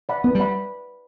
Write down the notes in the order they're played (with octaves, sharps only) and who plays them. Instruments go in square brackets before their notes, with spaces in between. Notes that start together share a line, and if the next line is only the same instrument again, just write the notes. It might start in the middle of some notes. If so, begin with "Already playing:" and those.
[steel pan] D5 F#5 B5
[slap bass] B3 [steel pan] B4
[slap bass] G3
[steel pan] D5 F#5 B5